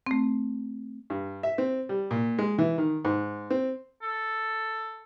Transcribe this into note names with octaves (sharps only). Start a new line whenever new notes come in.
A3 C4
G2
E5
C4
G3
A#2
G#3
E3
D#3
G#2
C4
A4